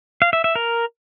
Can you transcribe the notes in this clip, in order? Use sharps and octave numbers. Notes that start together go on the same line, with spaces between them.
F5
E5
E5
A#4